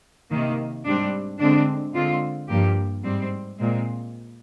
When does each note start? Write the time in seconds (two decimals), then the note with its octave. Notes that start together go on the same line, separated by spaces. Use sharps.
0.30 C3 D#3 A#3
0.85 G#2 G3 C4 D4
1.40 D3 G#3 C4 D4
1.94 D3 G#3 C4 F4
2.49 G2 F3 A#3 G4
3.04 G#2 G3 C4
3.58 A#2 G#3 C4